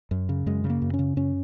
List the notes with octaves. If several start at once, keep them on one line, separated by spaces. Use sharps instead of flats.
F#2
C#3
F#2 G#3
C#3
A#3
F#2
C#4
C#3
F#2 C#4